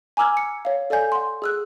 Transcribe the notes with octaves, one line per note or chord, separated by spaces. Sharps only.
G#5 A#5 D6 E6 F6 G#6
C#7
C#5 F5
A4 D5 F5 G#5 G6
F#5 C6
G#4 E6 F#6